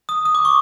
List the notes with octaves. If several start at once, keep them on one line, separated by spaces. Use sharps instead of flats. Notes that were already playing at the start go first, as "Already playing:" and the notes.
D#6
D#6
D6
C#6